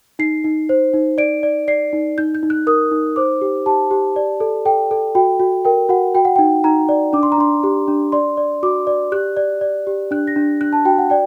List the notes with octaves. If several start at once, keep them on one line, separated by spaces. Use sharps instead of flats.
D#4 C7
D#4
C5
D#4
D5 D7
D5
D5 C7
D#4
D#4 G6
G6
D#4
F#6
A#4 D#6
D#4
C5 D6
G4
G4 A5
G4
D5
A4
A4 G5
A4
F#4 G5
F#4
A#4 G5
F#4 F#5
F#4 G5
F#5
D#4 G5
D#4 A#5
D5
D4 D6
C6
A#5
D4 C6
G4
D4
D5 C6
D5
F#4 D6
D5
G4 F#6
D5
D5
G4
D4 F#6
A#6
D4
D4 F#6
A5
F#4 G5
F#5
D5 G5